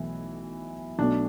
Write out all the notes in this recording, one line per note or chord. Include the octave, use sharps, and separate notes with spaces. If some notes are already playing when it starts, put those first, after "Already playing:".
Already playing: B1 B2 E3 A3 E4
B1 B2 A3 D4